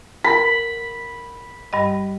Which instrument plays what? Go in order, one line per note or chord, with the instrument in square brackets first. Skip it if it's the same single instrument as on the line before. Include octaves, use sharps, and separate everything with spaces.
[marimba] A#4 [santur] B5
[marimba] G2 G3 D#5